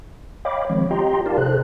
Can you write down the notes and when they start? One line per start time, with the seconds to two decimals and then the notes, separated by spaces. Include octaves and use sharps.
0.45 C#5 D#5 F5 G5 B5 D6
0.70 D#3 F3 G#3 C4 C#5
0.91 F4 G4 D#5 G5 A#5 C6
1.26 D#4 G4 A#4 D5 F5 A5
1.38 C3 G#4 A4 C5 F#6